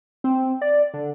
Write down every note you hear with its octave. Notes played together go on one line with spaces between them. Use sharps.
C4
D5
D3